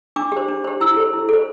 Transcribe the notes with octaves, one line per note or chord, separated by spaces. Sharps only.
D4 D6
G4 C5
D4
G4 C5
E4 E6
A4 C5
E4
A4 C5